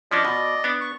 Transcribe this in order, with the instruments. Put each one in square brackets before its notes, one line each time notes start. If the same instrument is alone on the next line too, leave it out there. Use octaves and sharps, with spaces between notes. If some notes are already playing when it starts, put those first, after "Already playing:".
[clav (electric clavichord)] F3 C#4 D4 [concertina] D5 D#5
[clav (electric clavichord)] B2
B3 D4
[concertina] C#6